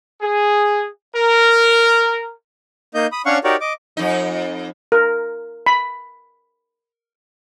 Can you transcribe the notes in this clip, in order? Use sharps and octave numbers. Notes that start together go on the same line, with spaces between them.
G#4
A#4
A#3 D#4 D#5 G6
B5 D#6
C#4 D4 C#5 F5 F#5 C#6
D#4 F#4 G4 A#4 C#5 D5
D#5 D6
F2 D#4
A#4
B5